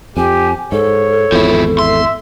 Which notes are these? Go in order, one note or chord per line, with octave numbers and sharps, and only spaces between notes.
F2 G4 G#5
G#2 A4 C#5
G#1 E2 F3 E4
E5 C6